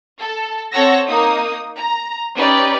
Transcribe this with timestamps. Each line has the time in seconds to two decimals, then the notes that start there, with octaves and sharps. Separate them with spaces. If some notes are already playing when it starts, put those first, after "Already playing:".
0.21 A4
0.72 C4 A4 C#5 F#5 E6 A#6
1.06 A#3 D#4 D#6
1.78 A#5
2.35 C#4 D#4 G4 B4 D5